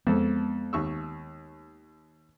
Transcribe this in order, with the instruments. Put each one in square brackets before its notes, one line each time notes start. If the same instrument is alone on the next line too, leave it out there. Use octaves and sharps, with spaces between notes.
[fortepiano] F2 A4 [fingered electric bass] G#3 B3
[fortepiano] D#2 C#6 E6